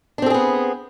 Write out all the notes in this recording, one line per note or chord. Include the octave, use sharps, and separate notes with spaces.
B3 C4 D4 G#4 A4